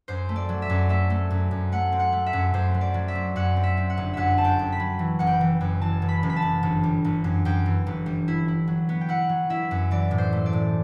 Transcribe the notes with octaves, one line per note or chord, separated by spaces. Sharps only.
F#2 C5
A3
D5
F#3
E5
F#2
A3 E5
A3
F#2
F#2
A3 F#5
C4
F#5
A3
E5
F#2
F#2 C5
F#3
D5
F#3
E5
C4
F#2 F#5
C4
E5
C4
F#5
G1
F#2 E5 F#5
C4 A5
G5
F#2
B5
F#3
E3
F#1 F#5
G5
E3
F#2
E3 A5
F#1
B5
F#1
B5
A5
F#1
G1
G3
G1
F#2
F#2 G5
E3
G1
G3
E4
E4
F#3
B3
G5
E4 F#5
F#3
E4 E5
F#2
E3 D5
A2
C5
A3
D5
A2